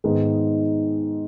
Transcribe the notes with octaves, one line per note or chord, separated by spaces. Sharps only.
G#2 D#3 G#3 B3 D#4